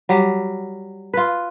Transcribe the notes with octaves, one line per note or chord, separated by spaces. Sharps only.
F#3 G3
F4 B4